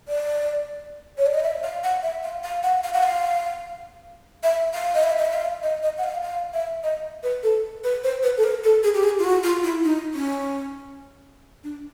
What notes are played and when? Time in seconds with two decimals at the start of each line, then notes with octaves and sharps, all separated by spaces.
0.08 D5
1.18 C#5
1.26 D5
1.34 D#5
1.43 E5
1.63 F5
1.83 F#5
2.03 E5
2.23 F5
2.44 F5
2.63 F#5
2.84 F5
2.94 F#5
3.03 F5
4.43 E5
4.74 F5
4.95 D#5
5.03 E5
5.18 D#5
5.26 E5
5.33 F5
5.63 D#5
5.83 D#5
5.98 F#5
6.04 F5
6.23 F5
6.54 E5
6.83 D#5
7.23 B4
7.43 A4
7.84 B4
8.04 C5
8.23 B4
8.37 A4
8.44 A#4
8.64 A4
8.83 G#4
8.94 G4
9.04 G#4
9.19 F4
9.24 F#4
9.43 F4
9.64 E4
9.84 D#4
10.14 C#4
11.64 D4